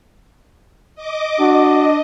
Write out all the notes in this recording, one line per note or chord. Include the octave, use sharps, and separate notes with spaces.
D#5 D6
D4 F#4 D#5